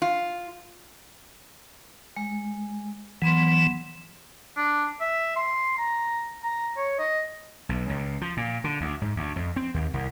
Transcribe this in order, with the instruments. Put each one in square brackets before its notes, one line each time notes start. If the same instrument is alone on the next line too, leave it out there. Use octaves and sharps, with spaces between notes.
[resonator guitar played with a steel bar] F4
[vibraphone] G#3
[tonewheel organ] E3 [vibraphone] F#3 B3 C6
[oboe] D4
E5
C6
A#5
A#5
C#5
D#5
[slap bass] B1
C#2
F3
A#2
D3
D2
G#2
D2
F2
C4
D#2
C2